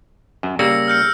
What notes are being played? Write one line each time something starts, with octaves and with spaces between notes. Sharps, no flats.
F#2
C#3 G3 A#3 E6 A#6 C#7
F6 G6 C#7